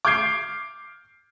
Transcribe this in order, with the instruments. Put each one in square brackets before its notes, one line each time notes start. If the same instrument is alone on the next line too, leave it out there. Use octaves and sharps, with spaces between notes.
[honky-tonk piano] D6 F6 G6 G#6 C7 D7